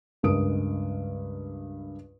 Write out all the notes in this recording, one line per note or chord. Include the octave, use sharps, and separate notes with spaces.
C#2 G2 G#3 A#4 D#6 D7